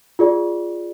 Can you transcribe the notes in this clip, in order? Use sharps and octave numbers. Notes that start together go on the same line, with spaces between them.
F4 G#4 D5